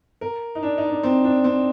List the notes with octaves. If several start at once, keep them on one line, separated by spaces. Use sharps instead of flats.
A#4
D#4
D4
D#4
D4
C4
D4
C4